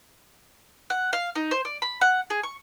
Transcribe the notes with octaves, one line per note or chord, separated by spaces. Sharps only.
F#5
F5
D#4
C5
D5
B5
F#5
G#4
C#6